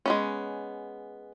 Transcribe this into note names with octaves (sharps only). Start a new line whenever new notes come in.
G#3 B3 C#4